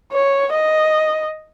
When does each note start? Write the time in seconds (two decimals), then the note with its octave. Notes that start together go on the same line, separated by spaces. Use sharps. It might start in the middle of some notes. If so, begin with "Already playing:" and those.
0.12 C#5
0.52 D#5